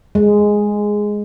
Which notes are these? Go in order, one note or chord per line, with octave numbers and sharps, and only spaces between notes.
G#3